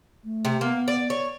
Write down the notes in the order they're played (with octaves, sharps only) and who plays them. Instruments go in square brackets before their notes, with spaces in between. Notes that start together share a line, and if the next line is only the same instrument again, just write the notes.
[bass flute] A3
[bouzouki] C3
[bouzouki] A#3 [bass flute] B3
[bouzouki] D5
C#5